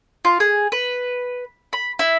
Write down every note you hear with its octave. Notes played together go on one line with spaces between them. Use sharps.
F4
G#4
B4
B5
E4